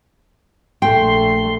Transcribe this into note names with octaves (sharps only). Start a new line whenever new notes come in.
A#1 A3 G5 C6